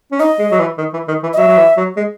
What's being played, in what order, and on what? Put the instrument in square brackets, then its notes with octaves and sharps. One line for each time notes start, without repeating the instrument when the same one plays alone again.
[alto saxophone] C#4
[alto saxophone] D#4 [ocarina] D#5
[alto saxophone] G#3
F#3
E3
D#3
E3
D#3
E3
[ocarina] D#5
[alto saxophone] F#3 [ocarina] E5
[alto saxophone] F#3
E3
F#3
G#3